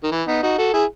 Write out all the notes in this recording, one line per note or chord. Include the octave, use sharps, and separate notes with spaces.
D#3
E3
B3 D#4
D#4 F#4
F#4 A4
E4 G#4